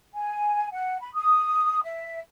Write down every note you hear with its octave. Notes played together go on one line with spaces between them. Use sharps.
G#5
F#5
B5
D#6
E5